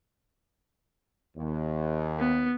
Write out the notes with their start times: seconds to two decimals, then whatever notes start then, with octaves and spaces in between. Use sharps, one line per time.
1.37 D#2
2.19 B3